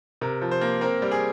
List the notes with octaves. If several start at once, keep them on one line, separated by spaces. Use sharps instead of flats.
C3 A#4
F3
C5
A#3
C4 A#4
G3
G#4